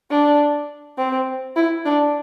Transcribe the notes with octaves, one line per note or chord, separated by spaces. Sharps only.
D4
C4
E4
D4